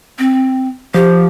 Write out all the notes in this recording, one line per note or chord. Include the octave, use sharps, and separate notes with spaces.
C4
F3 G4